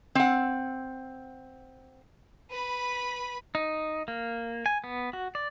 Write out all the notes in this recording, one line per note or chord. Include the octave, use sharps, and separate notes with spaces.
C4 F#5
B4 B5
D#4
A#3
G#5
B3
F#4
D5